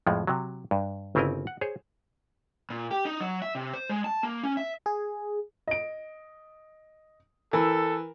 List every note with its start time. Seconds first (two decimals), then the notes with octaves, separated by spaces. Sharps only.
0.07 F2 A2 F3 G#3
0.27 C3 F#3
0.71 G2
1.15 G1 C#3 C4 E4 A#4 D#5
1.47 F#5
1.61 G#4 C5 C#5
2.70 A#2
2.91 G4
3.05 D#4
3.20 F#3
3.42 E5
3.55 C3
3.73 C5
3.89 G#3
4.04 A5
4.23 A#3
4.43 C#4
4.57 E5
4.86 G#4
5.68 D#5 D7
7.53 E3 A4 A#4